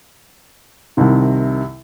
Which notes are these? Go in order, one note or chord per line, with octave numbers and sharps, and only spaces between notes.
C2 C3 D#3